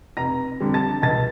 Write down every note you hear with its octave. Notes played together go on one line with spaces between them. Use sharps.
F1 A#5 A#6
F2 D3 G3
A5 A6
C#2 A5 A6